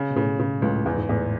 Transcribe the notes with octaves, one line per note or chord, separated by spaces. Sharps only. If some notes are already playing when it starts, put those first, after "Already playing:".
Already playing: C#3
B2
A2 C#3
C#3
C#2 A2
E2 G#2
G#2
E2 A2